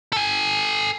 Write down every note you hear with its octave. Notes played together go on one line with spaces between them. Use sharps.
A4 G#5